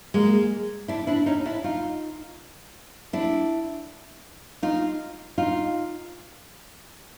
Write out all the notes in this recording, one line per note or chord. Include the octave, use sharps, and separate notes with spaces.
G#3 A#3
D4 E4
D4 E4
C#4 D#4
D4 E4
D#4 F4
D4 E4
D#4 F4
D#4 F4